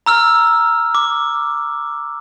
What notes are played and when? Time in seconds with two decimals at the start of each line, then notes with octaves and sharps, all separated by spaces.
0.06 A#5 E6 F6
0.95 D6